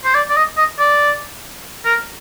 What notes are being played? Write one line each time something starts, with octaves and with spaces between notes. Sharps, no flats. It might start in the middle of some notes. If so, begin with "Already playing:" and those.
C5
D5
D5
D#5
D#5
D5
A#4